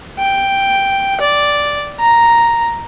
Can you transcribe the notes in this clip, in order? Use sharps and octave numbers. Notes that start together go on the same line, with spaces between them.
G5
D5
A#5